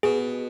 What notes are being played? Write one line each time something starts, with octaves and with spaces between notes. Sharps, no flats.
B2 G#4